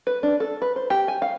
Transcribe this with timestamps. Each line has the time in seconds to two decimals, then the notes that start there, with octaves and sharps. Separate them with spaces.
0.07 B4
0.23 D4
0.40 A4
0.62 B4
0.76 C5
0.90 G4
1.08 G#5
1.22 F5